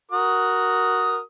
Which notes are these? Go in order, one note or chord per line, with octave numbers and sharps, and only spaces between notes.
F#4 A#4 D#6